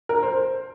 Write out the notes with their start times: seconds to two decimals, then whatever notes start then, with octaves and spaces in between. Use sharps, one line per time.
0.09 A#4
0.23 C5